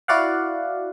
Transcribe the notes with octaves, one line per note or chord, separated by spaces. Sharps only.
E4 F#4 D5 F5 F#5